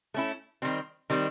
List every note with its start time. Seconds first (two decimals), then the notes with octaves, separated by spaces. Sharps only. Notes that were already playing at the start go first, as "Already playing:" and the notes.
0.14 A3 C#4 E4
0.62 D#3 G3 C4
1.10 D#3 G3 C4